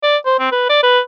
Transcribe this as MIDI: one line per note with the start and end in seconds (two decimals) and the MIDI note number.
0.03 0.17 74
0.25 0.37 72
0.40 0.49 60
0.52 0.68 71
0.69 0.78 74
0.83 0.99 71